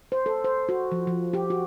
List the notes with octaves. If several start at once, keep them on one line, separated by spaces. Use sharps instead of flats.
C5
A4
C5
F#4
F3
F3
G4
F#4